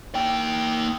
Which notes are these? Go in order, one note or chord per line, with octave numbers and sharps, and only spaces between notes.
A#3 G5